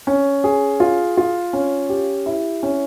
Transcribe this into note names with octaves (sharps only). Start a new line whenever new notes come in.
C#4
G#4
F4
F4
C#4
G4
E4
C#4